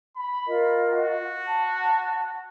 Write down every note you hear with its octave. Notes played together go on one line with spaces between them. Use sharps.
B5
F4 A#4 D#5
F#4
A5